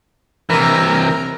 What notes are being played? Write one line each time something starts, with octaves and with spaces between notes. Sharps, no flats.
C3 E3 A#4